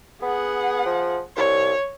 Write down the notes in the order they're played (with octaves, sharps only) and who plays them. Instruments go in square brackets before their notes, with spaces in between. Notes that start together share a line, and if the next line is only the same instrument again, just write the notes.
[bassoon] B3 [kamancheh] G#4 F#5
[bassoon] F3
[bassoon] C2 [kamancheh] C#5